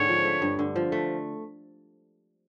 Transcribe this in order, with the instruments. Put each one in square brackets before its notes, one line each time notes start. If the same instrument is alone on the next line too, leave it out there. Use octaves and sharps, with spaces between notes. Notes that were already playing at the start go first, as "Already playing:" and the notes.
Already playing: [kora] G#2 D3 C4 [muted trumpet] C#5
[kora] F3
A3
G2
D3
F3
A3